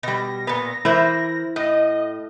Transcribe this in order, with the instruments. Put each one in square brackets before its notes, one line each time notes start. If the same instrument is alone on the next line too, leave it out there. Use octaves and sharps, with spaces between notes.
[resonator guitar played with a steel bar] B2 G3 [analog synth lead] A#6
[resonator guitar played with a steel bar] A#2 B3
[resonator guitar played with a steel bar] E3 A#4 C5 [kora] E4
[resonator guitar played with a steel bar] A2 [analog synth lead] D#5